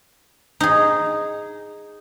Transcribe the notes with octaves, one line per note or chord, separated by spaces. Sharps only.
D#4 G#4